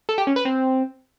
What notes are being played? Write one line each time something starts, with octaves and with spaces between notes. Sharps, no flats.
A4
G4
C#4
B4
C4